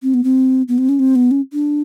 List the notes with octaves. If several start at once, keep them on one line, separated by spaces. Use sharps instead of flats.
C4
B3
C4
B3
C4
C#4
C4
B3
C#4
D4